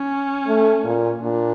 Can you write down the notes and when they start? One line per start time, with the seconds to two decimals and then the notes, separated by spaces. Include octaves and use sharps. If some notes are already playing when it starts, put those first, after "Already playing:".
Already playing: C#4
0.47 A3
0.84 A#2
1.21 A#2 D4